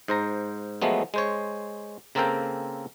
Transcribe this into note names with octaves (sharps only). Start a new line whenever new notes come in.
G#2 C5 A#5
F3 F#3 G#3 A3 B3
G#3 C5 C#5
C#3 A#3 C4 A4 A#4 G5